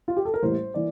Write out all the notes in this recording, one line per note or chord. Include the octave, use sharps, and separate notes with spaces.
F4
G4
A4
A#4
A1 A2 G3 A#3 C5
E3 A#3 D5